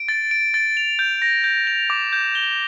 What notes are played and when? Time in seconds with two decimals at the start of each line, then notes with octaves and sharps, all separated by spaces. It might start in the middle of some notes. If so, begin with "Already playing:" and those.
Already playing: D7
0.08 A6
0.31 D7
0.54 A6
0.77 F7
0.99 G6
1.22 A#6
1.44 G6
1.67 F7
1.90 D6
2.13 G6
2.35 G7